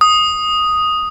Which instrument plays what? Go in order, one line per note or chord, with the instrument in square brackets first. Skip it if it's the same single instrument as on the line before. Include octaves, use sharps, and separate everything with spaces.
[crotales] D#6